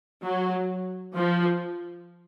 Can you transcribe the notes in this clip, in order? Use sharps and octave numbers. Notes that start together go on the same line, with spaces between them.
F#3
F3